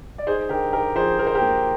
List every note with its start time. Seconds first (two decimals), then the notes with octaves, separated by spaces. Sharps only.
0.18 D5
0.27 D#4 G#4 C5
0.49 D3 G4 A#4
0.73 D#4 G4 A#4
0.96 F3 G#4 C5
1.18 F3 A#4
1.27 C5
1.35 G4 A#4
1.41 A#3